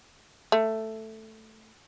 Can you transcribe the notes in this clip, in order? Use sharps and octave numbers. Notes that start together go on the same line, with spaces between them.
A3